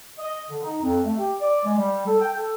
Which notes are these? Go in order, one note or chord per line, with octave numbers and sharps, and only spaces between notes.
D#5
D3
D#4
F2
A3
G4
D5
G#3
G3
A4
G5
A4